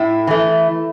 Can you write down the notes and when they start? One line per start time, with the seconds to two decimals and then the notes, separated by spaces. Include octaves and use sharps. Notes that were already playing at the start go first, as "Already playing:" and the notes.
Already playing: A2 E4
0.27 E3 A3